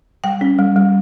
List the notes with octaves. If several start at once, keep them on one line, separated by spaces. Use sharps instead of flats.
G3 G5
C#4
G3
G3